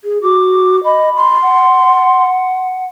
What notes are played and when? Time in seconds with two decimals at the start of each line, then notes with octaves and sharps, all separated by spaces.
0.04 G#4
0.22 F#4 D6
0.84 D#5 B5
1.17 C6
1.41 F#5